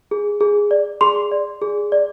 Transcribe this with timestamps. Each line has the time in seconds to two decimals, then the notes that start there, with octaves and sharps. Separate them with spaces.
0.11 G#4
0.41 G#4
0.71 D5
1.01 G#4 C6
1.32 D5
1.61 G#4
1.92 D5